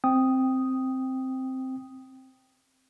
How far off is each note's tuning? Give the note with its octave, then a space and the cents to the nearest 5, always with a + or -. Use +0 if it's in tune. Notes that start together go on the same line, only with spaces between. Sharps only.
C4 +0 G5 +0 D#6 +0